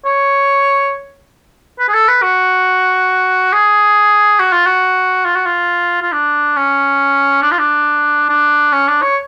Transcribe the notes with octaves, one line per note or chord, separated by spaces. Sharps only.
C#5
B4
G#4
A4
B4
F#4
G#4
F#4
F4
F#4
F4
F#4
F4
F4
D4
C#4
D4
F4
D4
D4
C#4
D4
C#5